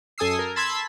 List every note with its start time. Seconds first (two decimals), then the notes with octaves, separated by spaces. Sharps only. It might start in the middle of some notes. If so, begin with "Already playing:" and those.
0.18 F#2 A4 G#5 D#6 E6 C7
0.39 A#4
0.56 A5 B5 C6 E6 G#6 B6